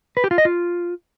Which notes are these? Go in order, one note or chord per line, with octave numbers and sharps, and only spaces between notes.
B4
G4
F4
D#5
F4